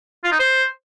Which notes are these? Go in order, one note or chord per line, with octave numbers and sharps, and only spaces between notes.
F4
D#4
C5